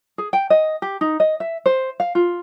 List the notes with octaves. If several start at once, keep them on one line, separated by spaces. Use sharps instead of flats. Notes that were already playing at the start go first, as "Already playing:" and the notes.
G#4
G5
D#5
G4
D#4
D#5
E5
C5
F5
F4